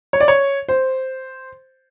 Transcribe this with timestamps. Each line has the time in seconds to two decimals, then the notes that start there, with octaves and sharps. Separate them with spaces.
0.13 C#5
0.20 D5
0.28 C#5
0.69 C5